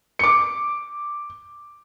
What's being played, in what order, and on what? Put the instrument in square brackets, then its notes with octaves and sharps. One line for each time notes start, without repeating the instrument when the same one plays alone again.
[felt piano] D6 C#7